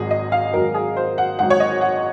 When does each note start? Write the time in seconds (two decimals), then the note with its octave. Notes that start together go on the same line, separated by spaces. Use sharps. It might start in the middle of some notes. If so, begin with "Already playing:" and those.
Already playing: G#1 G#2 F#3 G#4 D#5
0.11 D#5
0.32 F5
0.53 G#1 G#2 F#3 A#4
0.75 G#4
0.97 C5
1.18 F#5
1.39 G#1 G#2 F#3 F#5
1.50 C#5
1.60 D#5
1.81 F#5